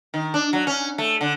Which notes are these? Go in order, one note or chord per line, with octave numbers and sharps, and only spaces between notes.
D#3
D4
F#3
C#4
A3
D3